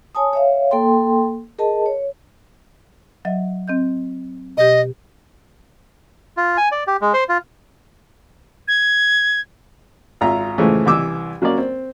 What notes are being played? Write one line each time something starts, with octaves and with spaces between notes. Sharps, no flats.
C#5 G#5 A5 D#6
C#5 E5 F5
A#3 A4 G5 C6
G#4 A#4 D#5 A5
C#5
F#3 D#5 E5
C4 D#5 G6
B2 G4 D#5
F4
G#5
D5
G4
G#3
C5
F4
G#6
G#1 F4 E5 A#5
A2 C#3 E3 F3 G#3 A3
C2 E3 D6 E6
F#3 A#3 C#4 A#4 D5
C4